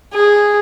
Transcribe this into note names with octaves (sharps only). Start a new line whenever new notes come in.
G#4